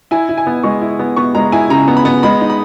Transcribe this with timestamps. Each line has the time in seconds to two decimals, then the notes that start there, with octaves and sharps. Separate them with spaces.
0.11 E4 G#5
0.29 E4
0.38 G#5
0.47 B3
0.63 G#3 C#6
0.82 E4
0.99 B3
1.17 B3 C#6
1.35 G#3 A#5
1.52 E4 G#5
1.70 C#3 A#5
1.88 B3
1.97 B5
2.05 B3
2.23 G#3 B5
2.41 D#4
2.50 B5